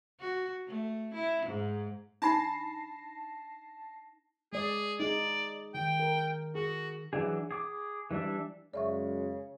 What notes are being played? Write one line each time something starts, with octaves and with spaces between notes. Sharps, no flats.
F#4
A3
E4
G#2
D4 D#4 A5 B5 A#6 C7
G#3 G#4 D5
D#4 G#4 D5
D#3 G5
A#4
F#4 G#4
E3 F#3 D4 G#4
G#4 D6
E3 G3 D4 E5
F#2 C#3 G#3 D5 E5 C#6